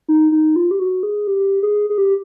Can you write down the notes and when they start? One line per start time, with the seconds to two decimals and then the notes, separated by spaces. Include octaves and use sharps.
0.08 D#4
0.32 D#4
0.56 F4
0.71 G4
0.80 F#4
1.03 G#4
1.27 G4
1.63 G#4
1.90 G#4
1.98 G4